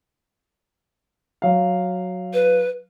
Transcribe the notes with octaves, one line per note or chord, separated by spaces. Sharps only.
F#3 F5
B4